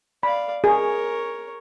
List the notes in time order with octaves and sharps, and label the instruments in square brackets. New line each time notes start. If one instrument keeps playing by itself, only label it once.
[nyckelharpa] D5 F5 [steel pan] B5
[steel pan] G#4 [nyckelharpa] A#4 C#5